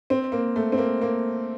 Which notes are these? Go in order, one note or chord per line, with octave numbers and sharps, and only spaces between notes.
C4
A#3
A3
C4
A#3
A#3